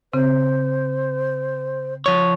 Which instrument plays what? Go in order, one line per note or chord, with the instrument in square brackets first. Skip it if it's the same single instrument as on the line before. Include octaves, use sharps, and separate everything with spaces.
[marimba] C#3 C4 [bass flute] C5
[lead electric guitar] F3 C#5